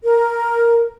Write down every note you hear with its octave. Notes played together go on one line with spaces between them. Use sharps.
A#4